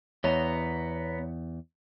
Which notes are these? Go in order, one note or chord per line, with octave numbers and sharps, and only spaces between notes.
E2 B3 C#5 D#5 A#5